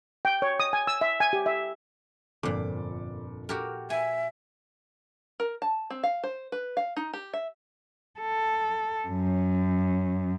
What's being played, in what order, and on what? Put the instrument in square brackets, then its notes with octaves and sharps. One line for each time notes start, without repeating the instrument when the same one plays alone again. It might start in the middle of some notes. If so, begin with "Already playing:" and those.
[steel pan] G5
C#5
D#6
G#5
E6
E5
G#5
G4
E5
[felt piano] G1 A4 D6 [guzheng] F2 A#2
[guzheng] F#4 G4 A#4 [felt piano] A4
[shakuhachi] E5 [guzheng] G#5
[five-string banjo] A#4
A5
C4
F5
C5
B4
F5
D#4
G4
E5
[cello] A4
F#2